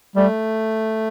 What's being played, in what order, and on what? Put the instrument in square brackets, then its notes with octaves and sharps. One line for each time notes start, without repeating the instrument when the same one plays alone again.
[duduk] G3 [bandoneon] A3